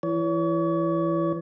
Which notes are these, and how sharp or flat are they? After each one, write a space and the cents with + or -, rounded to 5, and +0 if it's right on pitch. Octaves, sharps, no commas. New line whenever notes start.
E3 +20 C#5 +40